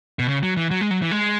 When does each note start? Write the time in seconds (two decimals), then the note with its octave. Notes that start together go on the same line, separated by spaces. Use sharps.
0.19 B2
0.29 C#3
0.43 F#3
0.57 E3
0.71 F#3
0.81 G#3
0.91 F#3
1.02 E3
1.11 G#3